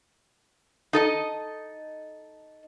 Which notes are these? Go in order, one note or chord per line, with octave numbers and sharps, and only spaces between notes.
D#4 A4 D#5